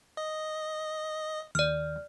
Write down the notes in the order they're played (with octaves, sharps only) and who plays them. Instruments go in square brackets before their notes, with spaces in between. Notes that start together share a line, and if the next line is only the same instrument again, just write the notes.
[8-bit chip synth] D#5
[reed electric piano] D#2 [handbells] D5 F6